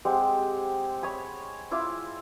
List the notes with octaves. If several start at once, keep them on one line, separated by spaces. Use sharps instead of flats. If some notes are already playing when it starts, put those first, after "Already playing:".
G#3 C4 G4 F#5
C#5 D#5 G#5 B5
E4 F4 D6